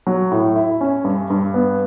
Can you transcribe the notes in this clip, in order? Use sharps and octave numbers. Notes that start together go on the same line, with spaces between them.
F#3
A2
E4
C#4
G2
G2
B3